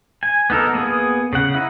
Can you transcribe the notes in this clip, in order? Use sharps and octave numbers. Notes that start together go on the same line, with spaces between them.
G#5
B3 D#4 A4 A#4
A#3 B3 G#4
C#3 F#5
D#4 E4